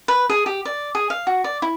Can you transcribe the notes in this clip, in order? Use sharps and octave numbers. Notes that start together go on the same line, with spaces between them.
B4
G#4
G4
D5
G#4
F5
F#4
D5
E4